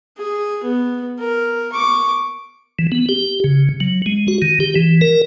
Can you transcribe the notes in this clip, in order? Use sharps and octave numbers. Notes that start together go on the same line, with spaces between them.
G#4
B3
A#4
C#6 D6
E3
B3
G4
C#3
F#3
G#3
F#4
D#3
G4
E3
A#4